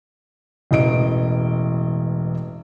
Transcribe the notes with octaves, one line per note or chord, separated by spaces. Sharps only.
E1 A1 D#5 D7